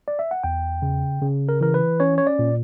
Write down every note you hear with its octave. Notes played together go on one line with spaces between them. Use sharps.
D5
E5
F#5
E2 G5
C#3
C#3
A#4
E3 A#4
B4
C#4 C#5
C#5
D5
A#2